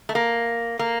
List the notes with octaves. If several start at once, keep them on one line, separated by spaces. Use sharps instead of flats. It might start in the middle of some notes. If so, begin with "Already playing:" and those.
A3
A#3
A#3